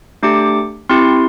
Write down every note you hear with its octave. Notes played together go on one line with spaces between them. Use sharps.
A3 D4 G4 D6
C4 E4 G4 C6